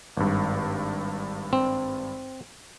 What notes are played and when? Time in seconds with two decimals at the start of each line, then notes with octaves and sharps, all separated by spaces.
0.17 G#1 G2
1.53 C4